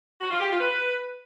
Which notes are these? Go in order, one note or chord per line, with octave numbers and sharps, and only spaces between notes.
F#4
F4
G4
F4
B4